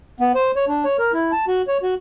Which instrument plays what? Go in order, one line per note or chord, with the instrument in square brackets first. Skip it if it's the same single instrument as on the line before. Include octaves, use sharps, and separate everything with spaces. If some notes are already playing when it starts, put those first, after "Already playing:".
[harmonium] B3
C5
C#5
D4
C#5
A#4
E4
A5
F#4
C#5
F#4